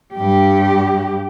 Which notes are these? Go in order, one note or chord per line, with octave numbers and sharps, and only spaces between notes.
G2 G4